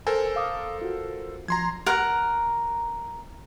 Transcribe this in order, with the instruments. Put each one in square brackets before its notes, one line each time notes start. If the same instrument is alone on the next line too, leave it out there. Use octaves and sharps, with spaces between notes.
[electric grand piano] A4 A#4 C5 [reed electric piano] G#5
[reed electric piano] F5 D6 D#6
F4 F#4
[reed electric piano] F3 [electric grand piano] A#5 C6 G#6
[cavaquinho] A#4 F#5